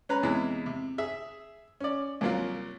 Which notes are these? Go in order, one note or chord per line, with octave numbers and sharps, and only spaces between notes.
C#4 B4 A#5
E2 C3 G#3 E4
C3
G#4 E5
C#4 D5
C2 F#3 A#3 F4